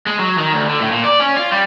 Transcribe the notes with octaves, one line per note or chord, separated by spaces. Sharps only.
G#3
F#3
D#3
D2
D3
A2
A#2
D5
C#4
F4
G3